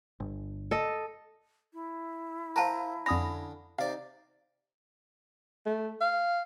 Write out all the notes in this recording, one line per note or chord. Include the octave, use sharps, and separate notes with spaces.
G1
A4 D#5
E4
A#4 C5 F5 A5 A#5
F2 D3 C#4 B5 D#6 A#6
C3 D#4 D5 F5
A3
F5